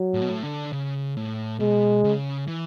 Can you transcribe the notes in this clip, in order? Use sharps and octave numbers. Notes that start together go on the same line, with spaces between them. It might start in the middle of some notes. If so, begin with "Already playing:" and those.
Already playing: F#3
A2
B2
A2
D3
C#3
A2
B2 G#3
C#3
E3